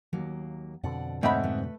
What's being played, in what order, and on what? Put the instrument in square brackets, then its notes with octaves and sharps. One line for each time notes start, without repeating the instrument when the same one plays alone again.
[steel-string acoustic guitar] D#2 F#3 A#3
[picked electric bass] F2 B2 D3 [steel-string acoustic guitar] D5 F#5
[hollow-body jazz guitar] G#2 C4 B5 [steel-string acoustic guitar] A3 C#5 [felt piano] D#5 E5 F#5
[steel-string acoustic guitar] A3 B4